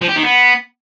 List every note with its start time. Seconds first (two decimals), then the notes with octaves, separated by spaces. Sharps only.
0.02 F3
0.09 G4
0.16 D#3
0.23 B3